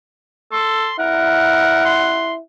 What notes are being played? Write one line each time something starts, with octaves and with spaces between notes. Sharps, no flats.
A4 C6
E4 A#4 F#5
C6